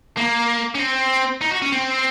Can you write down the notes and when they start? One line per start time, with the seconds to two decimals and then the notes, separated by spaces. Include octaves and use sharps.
0.17 A#3
0.75 C#4
0.79 C4
1.41 D#4
1.51 F#4
1.62 C#4
1.72 C4